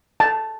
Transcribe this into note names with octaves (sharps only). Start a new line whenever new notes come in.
A5